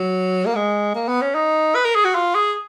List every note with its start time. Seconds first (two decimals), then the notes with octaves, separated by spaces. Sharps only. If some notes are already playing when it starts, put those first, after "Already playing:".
Already playing: F#3
0.47 A#3
0.55 G#3
0.95 A#3
1.08 B3
1.21 C#4
1.35 D#4
1.75 B4
1.85 A#4
1.95 G#4
2.04 F#4
2.15 F4
2.35 G#4